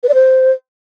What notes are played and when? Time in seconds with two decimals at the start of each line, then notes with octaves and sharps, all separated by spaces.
0.03 B4
0.09 D5
0.14 C5